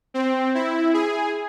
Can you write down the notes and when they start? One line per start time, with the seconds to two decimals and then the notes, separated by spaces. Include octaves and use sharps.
0.14 C4
0.55 E4
0.94 G#4